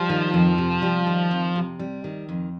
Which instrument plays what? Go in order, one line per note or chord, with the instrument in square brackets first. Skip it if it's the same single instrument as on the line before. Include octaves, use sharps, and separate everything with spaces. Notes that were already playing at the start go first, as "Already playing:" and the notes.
Already playing: [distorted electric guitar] F3 [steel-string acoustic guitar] G3
[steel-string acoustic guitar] D#3
F2
C3
G3
D#3
F2
C3
G3
D#3
F2